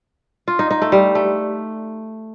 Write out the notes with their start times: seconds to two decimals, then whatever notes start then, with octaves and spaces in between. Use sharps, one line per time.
0.48 F4
0.59 D#4
0.71 D#4
0.82 A3
0.92 G3
1.15 A3